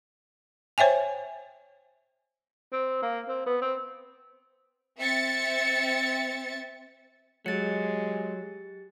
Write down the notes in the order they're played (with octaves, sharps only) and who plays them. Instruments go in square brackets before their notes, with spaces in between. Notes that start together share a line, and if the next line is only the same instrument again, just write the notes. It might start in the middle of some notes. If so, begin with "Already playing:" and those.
[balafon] C5 C#5 E5 G5 G#5
[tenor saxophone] C4
A#3
C4
B3
C4
[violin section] C4 E5 A6 C#7
[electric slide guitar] F#3 [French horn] G#3 [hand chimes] G4 A6 C#7